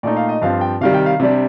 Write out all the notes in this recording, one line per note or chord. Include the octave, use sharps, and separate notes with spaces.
A#2 A3 D#4 D5
F5
D#5
G2 F3 C4 F5
G5
C3 D#3 G3 F5
G5
F5
C3 G3 D4